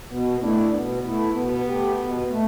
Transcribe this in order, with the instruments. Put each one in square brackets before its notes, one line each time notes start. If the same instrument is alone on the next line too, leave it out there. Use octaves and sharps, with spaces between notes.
[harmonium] B2 [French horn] B3
[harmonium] A3 E4 [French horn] D4
[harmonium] B2 [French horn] B3
[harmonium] A3 E4
[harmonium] B2 [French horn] B3
[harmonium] A3 G4
B2
A3